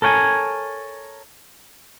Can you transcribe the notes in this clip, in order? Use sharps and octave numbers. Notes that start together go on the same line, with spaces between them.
A4 A#4 C#5 G5 G#5